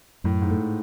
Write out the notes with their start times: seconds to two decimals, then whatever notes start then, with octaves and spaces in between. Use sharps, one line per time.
0.24 F#2 A2
0.42 G#2
0.51 A3